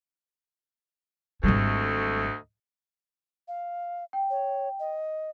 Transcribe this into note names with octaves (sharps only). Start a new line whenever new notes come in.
G#1 D2 G3 A3 D#5
F5
G5
C#5
D#5